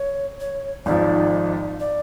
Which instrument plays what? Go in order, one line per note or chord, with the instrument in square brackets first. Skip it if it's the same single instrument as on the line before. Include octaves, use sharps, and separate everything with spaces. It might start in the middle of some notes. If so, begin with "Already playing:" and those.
Already playing: [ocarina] C#5
C#5
[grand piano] G#1 G#2 F3 [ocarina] D5
[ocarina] D5